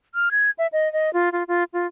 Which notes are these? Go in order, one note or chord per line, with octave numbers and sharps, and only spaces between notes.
F6
G#6
E5
D#5
D#5
F4
F4
F4
F4